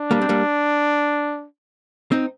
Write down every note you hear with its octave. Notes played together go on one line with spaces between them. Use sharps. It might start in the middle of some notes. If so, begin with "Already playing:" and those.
Already playing: D4
G3 A#3
C4
G3 A#3
C4 D#4